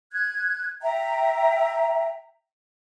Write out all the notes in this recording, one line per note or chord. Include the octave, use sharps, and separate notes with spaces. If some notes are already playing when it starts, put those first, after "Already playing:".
F#6 G#6
E5 G5 A#5